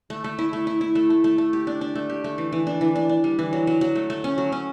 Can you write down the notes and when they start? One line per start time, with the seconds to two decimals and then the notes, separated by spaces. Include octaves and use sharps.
0.10 A3
0.24 A3
0.39 E4
0.53 A3
0.67 E4
0.81 E4
0.95 A3
1.10 A3
1.24 A3
1.38 A3
1.53 G4
1.67 D4
1.81 D4
1.95 A3
2.10 G4
2.24 A3
2.38 E3
2.52 E3
2.67 D4
2.81 E3
2.96 D4
3.09 D4
3.24 G3
3.39 E3
3.53 F#3
3.67 F#3
3.81 F#3
3.95 A3
4.10 A3
4.24 C#4
4.38 F#3
4.52 C#4